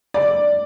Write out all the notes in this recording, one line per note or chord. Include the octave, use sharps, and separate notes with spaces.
D5